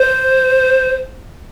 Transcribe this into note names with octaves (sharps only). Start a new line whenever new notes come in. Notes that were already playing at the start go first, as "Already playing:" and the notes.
Already playing: C5